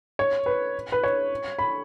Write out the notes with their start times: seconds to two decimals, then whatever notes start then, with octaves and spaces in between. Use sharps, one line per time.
0.19 C#5
0.46 B4
0.92 B4
1.04 C#5
1.59 B5